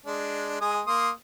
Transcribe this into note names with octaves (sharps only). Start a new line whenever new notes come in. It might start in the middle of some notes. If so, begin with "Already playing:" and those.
G#3 D4
G#3 G#5 D#6
A#3 C6 D#6